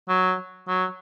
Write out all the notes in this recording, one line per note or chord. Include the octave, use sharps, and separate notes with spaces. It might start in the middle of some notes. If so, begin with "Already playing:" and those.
F#3
F#3